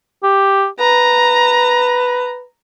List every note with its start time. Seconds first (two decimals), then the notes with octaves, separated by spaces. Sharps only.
0.23 G4
0.80 B4 A#5